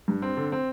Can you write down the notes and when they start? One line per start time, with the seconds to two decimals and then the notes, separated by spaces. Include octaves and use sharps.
0.08 G2
0.22 C4
0.37 D3
0.52 C4